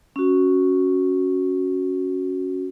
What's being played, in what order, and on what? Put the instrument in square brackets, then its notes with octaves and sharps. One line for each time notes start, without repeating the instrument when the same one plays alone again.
[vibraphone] C#4 F#4